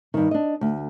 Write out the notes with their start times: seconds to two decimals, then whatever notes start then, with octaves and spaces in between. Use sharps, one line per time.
0.14 G2 D#3
0.31 D4 D#5
0.61 D2